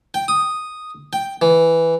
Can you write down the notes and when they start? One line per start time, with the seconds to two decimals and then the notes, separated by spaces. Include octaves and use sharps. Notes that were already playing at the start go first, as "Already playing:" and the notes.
0.14 G5
0.28 D#6
1.13 G5
1.42 E3